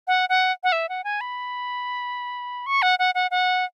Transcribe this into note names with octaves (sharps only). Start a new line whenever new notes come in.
F#5
F#5
F#5
E5
F#5
G#5
B5
C#6
F#5
F#5
F#5
F#5